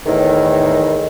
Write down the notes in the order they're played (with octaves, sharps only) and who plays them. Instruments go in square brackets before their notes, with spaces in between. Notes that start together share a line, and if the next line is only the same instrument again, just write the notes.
[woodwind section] E2 A2 D#3